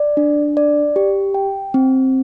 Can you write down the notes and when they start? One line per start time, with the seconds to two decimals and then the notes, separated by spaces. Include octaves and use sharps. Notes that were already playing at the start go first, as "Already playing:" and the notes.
Already playing: D5
0.17 D4
0.57 D5
0.96 G4
1.34 G5
1.74 C4